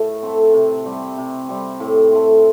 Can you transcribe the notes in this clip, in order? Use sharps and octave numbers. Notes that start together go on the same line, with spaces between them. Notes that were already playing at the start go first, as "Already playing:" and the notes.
Already playing: A2 A3
A3 C4
C3
G3 C4
C3
G3 C4
A2
A3 C4